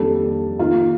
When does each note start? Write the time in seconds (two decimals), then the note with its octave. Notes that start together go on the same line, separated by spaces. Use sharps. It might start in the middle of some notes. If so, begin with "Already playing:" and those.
Already playing: F2 D#3 G3 A#3 D4 A4
0.59 D#3 A#3 D#4 F4